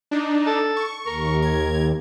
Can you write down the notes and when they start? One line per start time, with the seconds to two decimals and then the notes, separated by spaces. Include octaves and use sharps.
0.11 D4 D#4
0.47 A4
0.77 C#6
1.07 D#2 A#4
1.42 G#6